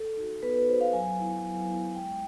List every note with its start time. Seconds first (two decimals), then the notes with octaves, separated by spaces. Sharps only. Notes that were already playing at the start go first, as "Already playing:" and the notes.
Already playing: A4
0.17 D#4 F#4
0.43 B3 B4
0.56 B4
0.69 D#4 F#4 C5
0.81 F5
0.93 F#3 G#5
1.19 B3 E4
1.44 F#3
1.70 B3 E4
1.95 G#3 G5